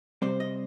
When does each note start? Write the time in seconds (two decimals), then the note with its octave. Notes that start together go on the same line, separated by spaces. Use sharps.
0.22 C3 G3 C4 C5
0.40 D#5